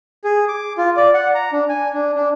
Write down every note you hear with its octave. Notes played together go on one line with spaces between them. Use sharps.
G#4
D6
F4
D5
F#5
A#5
D4
G#5
D4
D4